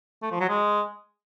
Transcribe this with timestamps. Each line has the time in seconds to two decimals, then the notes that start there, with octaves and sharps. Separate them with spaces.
0.22 A3
0.31 F3
0.40 F#3
0.49 G#3